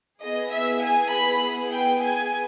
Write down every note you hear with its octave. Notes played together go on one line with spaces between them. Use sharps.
B3 E4 G#4 D#5
E5
G#5
B5
G5
G#5